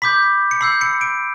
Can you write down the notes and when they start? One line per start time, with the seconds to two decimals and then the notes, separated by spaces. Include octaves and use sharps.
0.02 B5 D6 G6 B6
0.51 C#7
0.61 B5 E6 G6 C7
0.81 C#7
1.01 D7